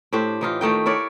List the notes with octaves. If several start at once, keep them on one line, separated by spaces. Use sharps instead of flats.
A2 D4 G4 C5
E3 D#4 F4
D#3 A3 D#4 G5
E4 A#4 C#5 D5